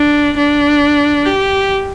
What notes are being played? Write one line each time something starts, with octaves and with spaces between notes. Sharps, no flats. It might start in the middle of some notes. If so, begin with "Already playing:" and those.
Already playing: D4
D4
G4